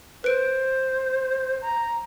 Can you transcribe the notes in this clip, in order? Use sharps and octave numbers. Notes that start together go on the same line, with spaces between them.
B4 C5 D7
A#5